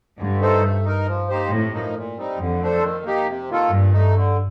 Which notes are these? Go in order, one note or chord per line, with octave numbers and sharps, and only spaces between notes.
G2 D3
A3 D#4 A4 C5
A3
D#4 A#4
F3
A#3 D#4 G4 C5
A2 C3
F3 A#3 D#4
A#2
G3 C4 D#4
F2 D3
A3 D4 A4 C5
D#3
A#3 D#4 G4
C3
D#3 A#3 F4 A4
G2 A#2
A3 D#4
D3